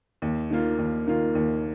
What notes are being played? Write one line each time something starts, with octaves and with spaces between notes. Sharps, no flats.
D#2
D#3 A#3 F4
D#2
D#3 A#3 F4
D#2